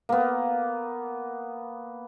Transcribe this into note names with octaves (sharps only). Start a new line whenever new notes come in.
A#3 B3